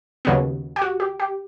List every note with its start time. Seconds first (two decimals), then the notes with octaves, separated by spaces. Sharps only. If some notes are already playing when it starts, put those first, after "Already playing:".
0.25 D#2 C#3 F#3 B3
0.76 G4
0.82 F#4
1.00 G4
1.20 G4